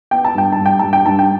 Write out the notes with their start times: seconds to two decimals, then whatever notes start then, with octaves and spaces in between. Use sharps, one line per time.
0.11 B3 G5
0.25 A5
0.35 G2 G5
0.52 A5
0.58 G2
0.66 G5
0.79 G2 A5
0.93 G5
1.05 G2 A5
1.19 G5